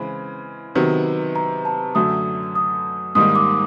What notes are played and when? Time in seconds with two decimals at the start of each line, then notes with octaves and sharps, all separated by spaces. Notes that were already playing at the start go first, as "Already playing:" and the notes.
Already playing: C#3 E3 G#3 C4 B5
0.75 C3 D#3 F#3 B3
1.36 A#5
1.65 A5
1.95 F#2 D3 F#3 A3 D#6
2.55 D#6
3.15 G#2 D#3 G3 A#3 D#4 D#6
3.36 D6